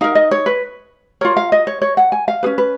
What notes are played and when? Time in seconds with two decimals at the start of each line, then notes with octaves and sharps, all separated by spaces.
0.01 D#4 A#4 F5
0.15 D#5
0.31 C#5
0.46 B4
1.21 F4 A#4 C#5
1.37 F5
1.52 D#5
1.67 C#5
1.82 C#5
1.97 F#5
2.12 G#5
2.28 F5
2.43 C#4 G#4 B4
2.58 B4